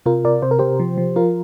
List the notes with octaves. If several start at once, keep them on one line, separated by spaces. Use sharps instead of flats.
C3 F4 A#4
C3 A#4 D5
C3 C5
A#4
C3 G4 C5
F3
F3
F3 F4 A#4